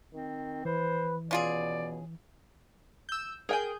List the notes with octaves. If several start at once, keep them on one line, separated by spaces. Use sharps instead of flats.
D#3 C4
E3 B4 C5
B2 C#4 F4 G#4 D5
E6 G6
G#4 A#4 G5 G#5 G6